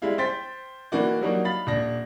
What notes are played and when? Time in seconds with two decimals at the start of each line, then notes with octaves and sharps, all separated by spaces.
0.02 G3 G#3 E4 F5
0.18 C5 G5 A6 B6
0.92 D#3 E3 A#3 F#4 D5
1.22 F#3 G3 A#3 D4 D#4 F#4
1.45 F5 B5 A6
1.67 D#1 D4 A#6